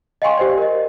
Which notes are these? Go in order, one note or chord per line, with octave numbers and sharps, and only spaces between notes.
D#5 F5 G5 G#5 C6 C#6
G4 C5 D5
A#4 D#5